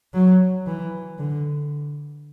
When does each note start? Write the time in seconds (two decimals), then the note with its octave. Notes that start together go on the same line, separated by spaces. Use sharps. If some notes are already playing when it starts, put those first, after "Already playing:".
0.13 F#3
0.67 E3
1.19 D3